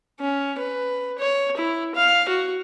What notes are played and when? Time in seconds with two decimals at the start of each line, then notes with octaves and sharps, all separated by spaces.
0.20 C#4
0.58 B4
1.19 C#5
1.57 E4
1.95 F5
2.29 F#4